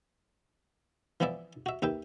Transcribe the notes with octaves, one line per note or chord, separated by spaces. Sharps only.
E3 F3 B3 E4 D5 E5
F#4 E5
D#2 B4 E5 G5